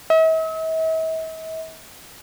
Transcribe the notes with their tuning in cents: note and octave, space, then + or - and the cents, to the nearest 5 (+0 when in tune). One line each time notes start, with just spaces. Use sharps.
E5 -45